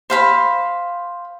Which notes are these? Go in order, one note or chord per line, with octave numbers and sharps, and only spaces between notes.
C5 F5 B5